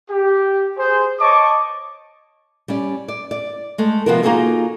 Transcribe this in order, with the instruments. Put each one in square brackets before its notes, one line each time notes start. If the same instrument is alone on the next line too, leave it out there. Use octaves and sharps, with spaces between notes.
[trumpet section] G4
G#4 C5
C#5 D#5 A5 C#6 D6
[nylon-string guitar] G3 C#4 D5
D5
D5
G#3 A3
C3 F3 B3 F4 F#4 A#4
A#3 D#4 F4 F#4 G#4 A4